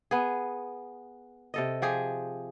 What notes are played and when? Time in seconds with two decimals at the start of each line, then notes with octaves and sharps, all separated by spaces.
0.11 B3 G#4
1.54 C3 A4 D#5
1.82 F3 G4 G#4